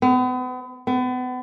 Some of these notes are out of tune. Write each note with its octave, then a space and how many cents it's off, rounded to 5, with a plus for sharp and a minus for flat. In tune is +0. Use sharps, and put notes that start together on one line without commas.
B3 +40
B3 +35